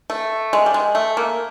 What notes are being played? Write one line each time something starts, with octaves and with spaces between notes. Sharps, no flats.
A3
G#3
G3
G#3
A3
A#3